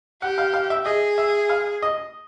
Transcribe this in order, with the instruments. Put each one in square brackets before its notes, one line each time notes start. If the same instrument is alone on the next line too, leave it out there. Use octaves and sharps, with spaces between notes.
[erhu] G4 [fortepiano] F#5
[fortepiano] F5
F5
E5
[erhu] G#4 [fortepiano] D#5
[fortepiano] E5
F5
D#5